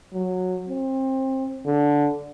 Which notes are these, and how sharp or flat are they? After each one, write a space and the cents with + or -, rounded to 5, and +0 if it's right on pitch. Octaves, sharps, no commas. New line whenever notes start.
F#3 -10
C4 +25
D3 -10